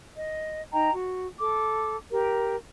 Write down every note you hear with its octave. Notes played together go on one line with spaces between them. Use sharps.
D#5
D#4 D#5 G5 A#5
F#4
A4 D6
G4 A#4